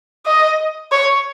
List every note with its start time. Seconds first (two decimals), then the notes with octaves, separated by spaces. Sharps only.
0.26 D#5
0.92 C#5